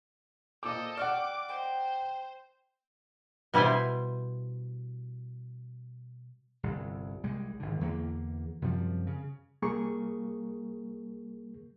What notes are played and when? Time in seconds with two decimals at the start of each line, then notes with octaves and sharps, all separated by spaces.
0.63 A#2 A4 C5 D#5 D6
0.97 D5 F#5 G5 C#6 D6 F6
1.49 C5 D#5 G5
3.54 B2 G3 E4 C5 G#5
6.63 G1 C2
7.24 C2 G3 G#3
7.60 G#1 D3
7.81 E2 D3 A#3
8.62 F#2 C3 F3 G3
9.07 C#3
9.62 C2 G3 A#3 G#4 A#4 C#6